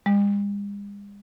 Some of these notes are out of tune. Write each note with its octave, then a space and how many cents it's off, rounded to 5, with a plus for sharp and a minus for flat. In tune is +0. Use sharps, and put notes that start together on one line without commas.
G#3 -45